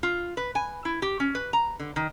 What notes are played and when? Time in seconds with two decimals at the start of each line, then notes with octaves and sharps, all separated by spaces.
0.03 F4
0.37 B4
0.55 G#5
0.85 E4
1.02 G4
1.20 C#4
1.35 B4
1.53 A#5
1.80 D3
1.96 D#3